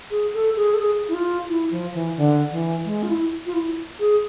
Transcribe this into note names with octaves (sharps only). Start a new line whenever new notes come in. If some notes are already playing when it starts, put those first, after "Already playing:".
G#4
A4
G#4
A4
G#4
E4
F4
E4
F3
E3
D3
E3
G#3
F4
E4
F4
E4
G#4